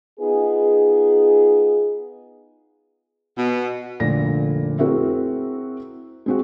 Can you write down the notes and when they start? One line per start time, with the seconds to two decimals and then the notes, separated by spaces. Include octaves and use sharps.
0.20 B3 D#4 F4 G#4
3.37 B2
4.00 F1 A#2 D3 A#6
4.79 C4 E4 F#4 G#4 A#4 E5
6.26 G#3 C4 F#4